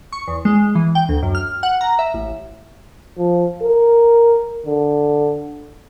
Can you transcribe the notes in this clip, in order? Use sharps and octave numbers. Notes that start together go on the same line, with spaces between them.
C#6
E2
G#3
E3
G5
D2
F#2
F6
F#5
A#5
E5
A1
F3
A#4
D3